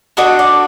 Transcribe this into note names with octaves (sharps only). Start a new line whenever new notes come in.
D4 F#4 A4 D#5
D5